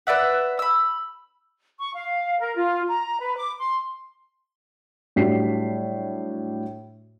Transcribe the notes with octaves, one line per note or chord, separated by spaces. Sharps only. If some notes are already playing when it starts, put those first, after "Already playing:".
B4 D5 E5 F#5
B5 E6
C#6
F5
A#4
F4
A#5
B4
D6
C6
A2 F#3 G3 D4 B6 C7